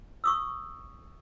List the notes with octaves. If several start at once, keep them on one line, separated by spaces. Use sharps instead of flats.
C#6 D#6 E6